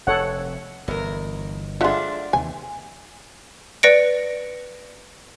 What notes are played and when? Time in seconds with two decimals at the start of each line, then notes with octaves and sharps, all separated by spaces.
0.07 F1 C3 A4 C#5 F#5
0.88 G1 E2 B2 A#4
1.81 D3 G#3 D4 F4 E5
2.33 D#2 C3 E3 G#5
3.83 B4 D5 A#6 C#7 D7